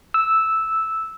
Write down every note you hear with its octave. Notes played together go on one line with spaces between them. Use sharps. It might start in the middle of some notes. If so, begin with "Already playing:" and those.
E6